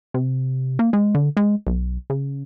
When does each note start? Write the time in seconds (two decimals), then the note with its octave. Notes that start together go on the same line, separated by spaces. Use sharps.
0.14 C3
0.79 A#3
0.93 G#3
1.15 D3
1.37 G#3
1.67 B1
2.10 C#3